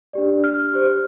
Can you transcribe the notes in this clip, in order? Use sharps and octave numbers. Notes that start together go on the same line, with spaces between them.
D4 G4 D5
F6
G4 C5